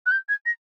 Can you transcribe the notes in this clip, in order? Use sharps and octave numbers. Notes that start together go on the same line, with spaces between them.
F#6
G6
G#6
A#6